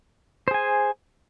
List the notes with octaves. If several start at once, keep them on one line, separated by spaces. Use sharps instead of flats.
G#4 C5 G#5